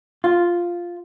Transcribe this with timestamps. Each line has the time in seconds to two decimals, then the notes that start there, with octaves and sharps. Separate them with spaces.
0.24 F4